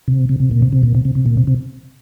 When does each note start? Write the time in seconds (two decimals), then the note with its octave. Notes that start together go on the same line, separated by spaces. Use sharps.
0.08 C3
0.29 C3
0.40 C3
0.51 A#2
0.62 C3
0.72 C3
0.83 A#2
0.95 C3
1.05 C3
1.15 C3
1.26 A#2
1.37 C3
1.47 C3